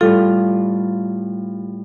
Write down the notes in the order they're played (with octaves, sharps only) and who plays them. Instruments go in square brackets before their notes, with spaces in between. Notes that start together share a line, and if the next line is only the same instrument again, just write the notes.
[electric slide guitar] A2 G3 F4 [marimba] A4